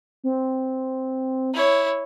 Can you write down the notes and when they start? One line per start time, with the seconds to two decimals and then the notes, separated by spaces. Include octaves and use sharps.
0.24 C4
1.54 E4 C#5